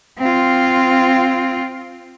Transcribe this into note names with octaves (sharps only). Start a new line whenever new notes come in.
C4 F4